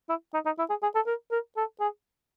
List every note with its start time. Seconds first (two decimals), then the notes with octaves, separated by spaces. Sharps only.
0.09 E4
0.34 D#4
0.45 D#4
0.59 E4
0.70 G#4
0.83 G#4
0.95 A4
1.06 A#4
1.31 A#4
1.57 A4
1.80 G#4